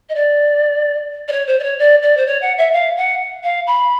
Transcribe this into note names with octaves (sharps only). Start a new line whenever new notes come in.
D#5
D5
D5
C#5
C5
D5
C#5
D5
D5
C5
C#5
F#5
E5
F5
F#5
F5
B5